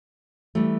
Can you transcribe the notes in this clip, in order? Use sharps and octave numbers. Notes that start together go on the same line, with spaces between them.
E3 G3 A3